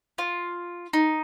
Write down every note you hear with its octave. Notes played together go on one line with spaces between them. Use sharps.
F4
D#4